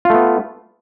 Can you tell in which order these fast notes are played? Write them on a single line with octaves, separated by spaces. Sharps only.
F4 A3 B3